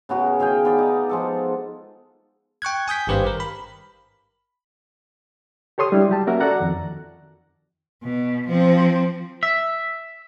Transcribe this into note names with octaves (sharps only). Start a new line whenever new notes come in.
C#3 B3 F#4 A#4
D#3 G#4 F5 G5
B3 D5 G5
D#4
F3 G#3 A4
G5 C#6 F#6 G#6
G#5 D#6 G6 B6
G#1 G2 G4 B4 C5 F5
A#4
B5
G4 A4 C#5 C6 D#6
G3 G#3 D4 E4
F#3 G4 A5
A#3 C#4 F#4 A#4 E5 F#5
F#4 A4 D5 F#5 A#5
F2 D#3
B2
F3 C4
E5